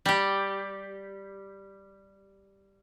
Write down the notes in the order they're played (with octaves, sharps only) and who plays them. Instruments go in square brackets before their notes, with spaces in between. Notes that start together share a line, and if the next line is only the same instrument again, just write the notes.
[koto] G3 G4